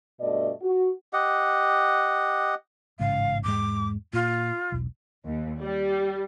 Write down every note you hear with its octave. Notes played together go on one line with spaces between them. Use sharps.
G2 B2 A3 D5 D#5
F#4
G4 D#5 F#5
A1 G#2 C#3 F5
E2 G#2 G#3 D6
A#2 F4
E1 B1
D#2
G3